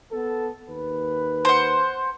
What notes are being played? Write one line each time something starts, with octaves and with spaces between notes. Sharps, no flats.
B3 A4
D#2 B4
C5 F#5